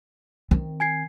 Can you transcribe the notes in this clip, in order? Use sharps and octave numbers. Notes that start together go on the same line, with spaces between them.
D#3 C4
G#5 G#6 C7